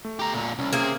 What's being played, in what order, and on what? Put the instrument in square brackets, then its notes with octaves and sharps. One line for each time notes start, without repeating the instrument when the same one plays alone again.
[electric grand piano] A3
[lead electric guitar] G4 A#5
A#2 D3
[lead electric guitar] C2 [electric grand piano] C#4
[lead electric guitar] C3 [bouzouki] A#3 G#4